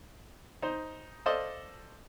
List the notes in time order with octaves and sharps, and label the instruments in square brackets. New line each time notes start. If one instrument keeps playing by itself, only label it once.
[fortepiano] D#4 C5
A4 C5 D5 D#5 F5